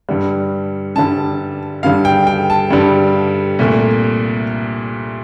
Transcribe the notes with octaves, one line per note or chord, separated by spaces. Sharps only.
G2 D3 G3
G2 D3 G3 A5
G2 D3 G3 F5
G5
G5
A5
G2 D3 G3
C2 A#2 A3